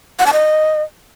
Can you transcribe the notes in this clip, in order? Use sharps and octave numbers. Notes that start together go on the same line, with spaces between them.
F#5
A5
D#5